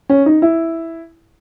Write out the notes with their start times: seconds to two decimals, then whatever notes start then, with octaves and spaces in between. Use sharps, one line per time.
0.09 C#4
0.26 D#4
0.42 E4